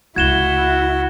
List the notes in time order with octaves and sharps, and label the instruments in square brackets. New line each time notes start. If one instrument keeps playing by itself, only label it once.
[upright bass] C#2 C#3 [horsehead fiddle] E4 [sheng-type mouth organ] F#4 [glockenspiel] G#6 E7 G7